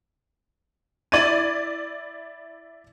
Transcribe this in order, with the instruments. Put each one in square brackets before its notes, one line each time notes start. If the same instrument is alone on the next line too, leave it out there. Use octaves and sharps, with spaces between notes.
[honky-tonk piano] E4 D5 G#6 D#7